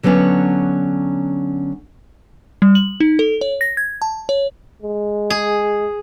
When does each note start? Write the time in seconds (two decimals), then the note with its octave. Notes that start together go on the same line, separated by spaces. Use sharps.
0.03 D3 F#3 A3 B3 C#4 D4
2.62 G3
2.75 F#7
3.00 D#4
3.19 A4
3.41 C#5
3.61 A#6
3.77 G#6
4.02 A5
4.29 C#5
4.82 G#3
5.30 G#4